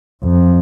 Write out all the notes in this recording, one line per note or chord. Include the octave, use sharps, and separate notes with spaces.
F2